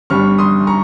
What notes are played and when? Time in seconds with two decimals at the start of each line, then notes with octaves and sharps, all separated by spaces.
0.10 G1 G2 G3 C#6 F6
0.38 C6 D#6
0.67 A#5 C#6